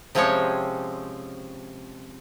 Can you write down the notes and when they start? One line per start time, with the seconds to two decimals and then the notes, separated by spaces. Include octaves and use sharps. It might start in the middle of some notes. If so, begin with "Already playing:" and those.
0.15 C3 F3 G#3 C4 C#4 C#5